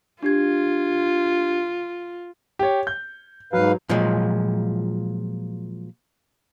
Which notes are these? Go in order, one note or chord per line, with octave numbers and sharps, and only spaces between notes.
D4 F4 G4 G#6
G4 C#5
G6
G#2 F#3 B4 F5
A#2 F3 F#3 G#3